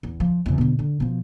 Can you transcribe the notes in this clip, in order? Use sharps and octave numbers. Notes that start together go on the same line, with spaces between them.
E2
F3
E2 C3
B2 D3
D3
B2 F3